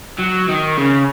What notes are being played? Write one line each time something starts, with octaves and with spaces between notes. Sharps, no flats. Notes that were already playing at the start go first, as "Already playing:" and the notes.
F#3
D#3
C#3